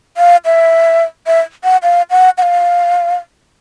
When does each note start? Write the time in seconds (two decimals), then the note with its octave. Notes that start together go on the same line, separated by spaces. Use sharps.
0.17 F5
0.45 E5
1.27 E5
1.64 F#5
1.83 F5
2.10 F#5
2.38 F#5
2.42 F5